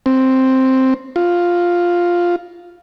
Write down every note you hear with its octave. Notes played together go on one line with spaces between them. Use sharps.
C4
F4